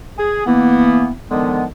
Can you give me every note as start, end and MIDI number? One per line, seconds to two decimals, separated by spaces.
0.18 0.43 68
0.46 1.10 52
0.46 1.10 58
0.46 1.10 59
1.31 1.64 50
1.31 1.64 51
1.31 1.64 53
1.31 1.64 56
1.31 1.64 59